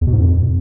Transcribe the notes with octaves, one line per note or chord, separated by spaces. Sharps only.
E2
B2
G#2
F2